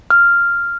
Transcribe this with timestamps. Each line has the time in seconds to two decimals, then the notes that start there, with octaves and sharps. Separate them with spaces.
0.10 F6